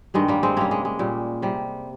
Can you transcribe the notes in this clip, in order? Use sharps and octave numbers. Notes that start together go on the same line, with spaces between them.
G2 D#3 G3 G#3
G3 A#3
G#3 C4
C3 G3 A#3 C#4
G#3
G#3
A#2 G3
C3 G3